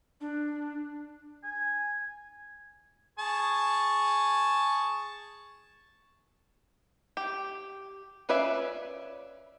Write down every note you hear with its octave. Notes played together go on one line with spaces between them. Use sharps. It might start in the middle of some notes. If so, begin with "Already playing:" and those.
D4
G#5
G#4 A5 C#6
G4
C#4 F4 B4 D5 E5